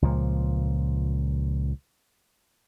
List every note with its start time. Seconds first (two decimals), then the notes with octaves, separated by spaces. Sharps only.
0.02 C#2 A#2 F3